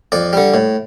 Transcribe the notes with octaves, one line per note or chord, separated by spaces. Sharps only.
F2 D5
D3 G3
A2